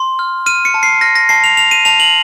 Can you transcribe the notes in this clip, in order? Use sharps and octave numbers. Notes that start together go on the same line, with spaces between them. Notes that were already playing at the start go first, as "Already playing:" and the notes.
Already playing: C6
F6
F6 D#7
C#7
A5
C7
F6 A#6
A#6
A5 C7
F7
A5 F7
D#7
A5 F7
F#7